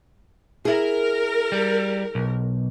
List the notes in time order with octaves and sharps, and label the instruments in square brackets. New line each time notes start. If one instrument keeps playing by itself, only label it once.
[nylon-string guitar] E4 G#4 [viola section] A#4
[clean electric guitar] G3
B1